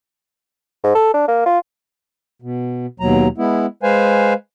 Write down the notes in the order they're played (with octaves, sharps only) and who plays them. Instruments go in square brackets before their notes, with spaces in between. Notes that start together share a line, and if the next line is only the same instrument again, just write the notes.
[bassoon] G#2
A4
D4
A#3
F4
[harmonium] B2
D#2 B2 F#3 A#5
G#3 B3 E4
G#3 B4 C5 F5 G#5